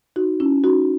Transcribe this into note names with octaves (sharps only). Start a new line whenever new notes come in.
D#4 F#4
C#4 E4
D#4 F#4